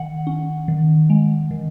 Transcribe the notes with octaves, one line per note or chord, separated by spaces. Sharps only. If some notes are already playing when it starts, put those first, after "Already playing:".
Already playing: D#3 F#5
C#4
D#3
G#3
D#3